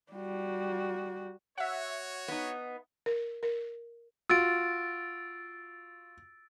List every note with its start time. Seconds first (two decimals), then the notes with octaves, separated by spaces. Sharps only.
0.12 G3 F#4
1.58 F#4 C#5 E5 F#5
2.28 B3 D#4
3.06 A#4
3.43 A#4
4.29 F4 F#4 E6 A6 D7